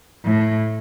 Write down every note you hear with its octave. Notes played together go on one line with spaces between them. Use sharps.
A2